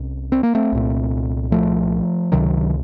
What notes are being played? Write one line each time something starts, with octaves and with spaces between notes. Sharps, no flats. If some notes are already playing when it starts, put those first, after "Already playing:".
Already playing: C2 C3 C#4
C4
A#3
A3 C4
C2 A#2
F3 A3
C#2 C3 D#3 F#3